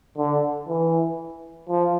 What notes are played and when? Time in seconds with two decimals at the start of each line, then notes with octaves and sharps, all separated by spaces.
0.18 D3
0.68 E3
1.69 F3